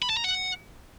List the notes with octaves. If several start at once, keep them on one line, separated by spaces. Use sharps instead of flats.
B5
A5
A#5
F#5